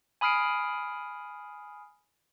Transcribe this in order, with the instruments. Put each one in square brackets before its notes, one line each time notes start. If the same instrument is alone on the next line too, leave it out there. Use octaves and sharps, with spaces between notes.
[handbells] G#5 B5 D#6 F6 C7 D7